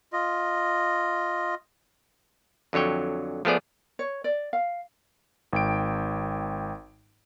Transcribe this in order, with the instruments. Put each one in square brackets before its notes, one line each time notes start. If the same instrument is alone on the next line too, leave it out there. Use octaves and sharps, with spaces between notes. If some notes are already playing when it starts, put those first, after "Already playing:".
[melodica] F4 D#5
[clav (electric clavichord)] F2 D3 F#3 C#5 G5
F3 A3 B3 G#4 D5
[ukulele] C#5
D5
F5
[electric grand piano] G#1 G5 D7